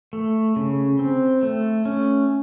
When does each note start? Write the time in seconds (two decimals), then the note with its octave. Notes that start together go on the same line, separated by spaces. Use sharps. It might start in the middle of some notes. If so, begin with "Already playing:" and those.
0.13 A3
0.56 C#3
0.99 C4
1.43 A3
1.85 C#4